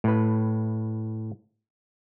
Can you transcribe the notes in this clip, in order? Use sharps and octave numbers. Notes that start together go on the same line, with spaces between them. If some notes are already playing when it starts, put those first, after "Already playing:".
A2 B4